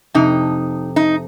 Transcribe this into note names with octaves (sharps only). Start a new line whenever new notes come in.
F2 C3 D#4
D#4